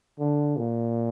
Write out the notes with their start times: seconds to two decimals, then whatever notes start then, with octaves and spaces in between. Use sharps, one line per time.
0.19 D3
0.57 A#2